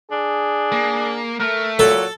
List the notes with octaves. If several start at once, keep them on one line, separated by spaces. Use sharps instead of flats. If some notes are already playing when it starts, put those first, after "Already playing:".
D4 G#4
A#3
A3 A#4
A#2 F#3 A4